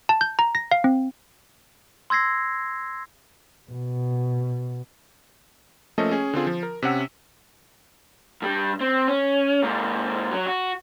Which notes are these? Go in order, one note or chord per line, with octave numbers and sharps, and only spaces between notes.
A5
G6
A#5
A#6
F5
C4
C6 E6 G#6 A#6 C7
B2
F3 A3 A#3 C#4 A4 D#5
C#4 G#4
D3 C4 F4 G#4
F3
A#4
C3 C#4 F#5 E6
G2 G3
C4
C#4
G#2 A#3
F#3
F#4